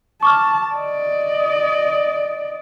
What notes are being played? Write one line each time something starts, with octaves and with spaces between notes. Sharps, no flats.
A5 C#6 D6 F6
D5 D#5